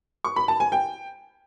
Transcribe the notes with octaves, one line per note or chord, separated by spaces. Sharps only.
C#6
B5
A5
G#5
G5